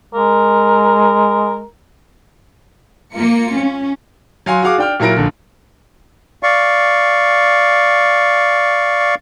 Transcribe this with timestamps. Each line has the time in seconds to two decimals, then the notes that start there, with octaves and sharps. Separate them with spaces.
0.14 G#3 A#4
3.16 A#3 F4 C#7
3.56 C#4
4.46 F#3 F5 G#5 C6
4.62 F#4 G#4 F5 D6
4.78 D4 G5 F6
5.00 A#2 F#3 E4 A#4 A#6 D7
5.16 A#1 D3
6.43 D5 F5 C#6